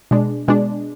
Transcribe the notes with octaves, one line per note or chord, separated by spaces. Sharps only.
B2 G#3 D4
B2 G#3 D4